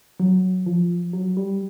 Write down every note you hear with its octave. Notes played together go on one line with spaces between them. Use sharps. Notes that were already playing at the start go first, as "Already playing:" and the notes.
F#3
F3
F#3
G3